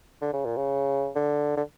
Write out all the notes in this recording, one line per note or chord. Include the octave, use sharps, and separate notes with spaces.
D3
C#3
A#2
C#3
D3
D3